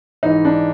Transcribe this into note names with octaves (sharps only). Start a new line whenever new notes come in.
G#2 E3 D#4
D4